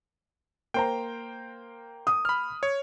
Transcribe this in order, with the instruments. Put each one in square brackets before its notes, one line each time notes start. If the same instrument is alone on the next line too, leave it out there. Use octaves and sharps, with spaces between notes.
[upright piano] A#3 C5 A#5 [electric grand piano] G5
[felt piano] D#6
[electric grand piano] B5 F6
C#5